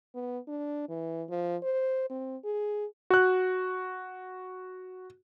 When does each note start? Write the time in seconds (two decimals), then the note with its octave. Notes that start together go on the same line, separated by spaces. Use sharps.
0.15 B3
0.48 D4
0.89 E3
1.30 F3
1.63 C5
2.10 C4
2.44 G#4
3.10 F#4 F#6